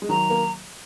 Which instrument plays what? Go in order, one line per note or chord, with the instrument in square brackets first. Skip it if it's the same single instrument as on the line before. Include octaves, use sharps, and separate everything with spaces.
[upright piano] G#3
[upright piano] D#3 F#3 [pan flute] A#5
[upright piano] A#3